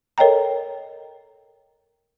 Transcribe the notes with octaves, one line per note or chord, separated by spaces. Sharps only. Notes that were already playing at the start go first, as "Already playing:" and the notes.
A4 A#4 C#5 D#5 G5 A#5